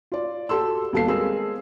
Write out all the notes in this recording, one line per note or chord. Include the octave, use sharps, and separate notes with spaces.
F4 D5
F#4 G4 A4 C6 E6
D#2 G3 B3 A4 F5 C7
G#3 C4 G#4 A#4 E6